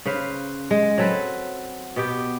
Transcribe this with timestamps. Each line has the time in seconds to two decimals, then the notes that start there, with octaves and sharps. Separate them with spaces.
0.05 C#3 B4 C5 F5
0.71 G#3
0.98 F#3 C4 A4 B4
1.96 B2 B3 G4 G5